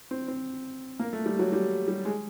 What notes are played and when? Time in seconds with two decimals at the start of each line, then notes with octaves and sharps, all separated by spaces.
0.11 C4
0.28 C4
0.99 A#3
1.13 A3
1.26 G3
1.39 F#3
1.53 G3
1.88 G3
2.05 G#3